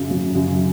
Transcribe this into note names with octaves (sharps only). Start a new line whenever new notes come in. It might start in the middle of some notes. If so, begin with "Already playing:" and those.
Already playing: F#2 C#3
F#3
F#2